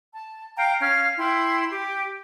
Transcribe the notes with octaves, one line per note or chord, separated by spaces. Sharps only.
A5
F5 G5 A#5
C#4 F5 F6
E4 G5 C6
G4